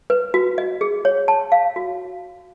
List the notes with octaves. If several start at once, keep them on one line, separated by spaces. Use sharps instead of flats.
B4
F#4
D#5
G#4
C#5
A5
F5
F#4